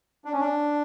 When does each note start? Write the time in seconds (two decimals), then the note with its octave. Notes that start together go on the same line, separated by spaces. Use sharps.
0.25 D4
0.32 C#4
0.40 D4